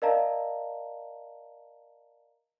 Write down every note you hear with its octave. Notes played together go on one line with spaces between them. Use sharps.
A#4 D5 D#5 F5 A5 A#5